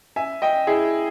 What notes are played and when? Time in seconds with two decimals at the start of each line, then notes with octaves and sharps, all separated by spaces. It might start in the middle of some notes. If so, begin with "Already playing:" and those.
0.16 E5 G#5
0.42 D#5 G5
0.67 E4 G#4